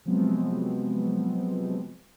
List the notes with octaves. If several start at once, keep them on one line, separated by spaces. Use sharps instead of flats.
C3 F3 F#3 G#3 B3 C4